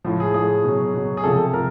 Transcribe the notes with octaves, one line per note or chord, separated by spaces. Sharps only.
A2 F3
G#4
A2 F3 G#4
B2 F#3
B2 F#3
G#4
C3 F3 A4
A4
F3 A#4